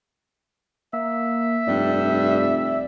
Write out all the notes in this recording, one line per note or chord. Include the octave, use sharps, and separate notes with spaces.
A#3 E5
F1 G2 D5